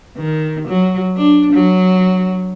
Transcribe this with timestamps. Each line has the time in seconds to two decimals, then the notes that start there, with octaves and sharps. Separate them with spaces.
0.17 D#3
0.69 F#3
1.17 D4
1.53 F#3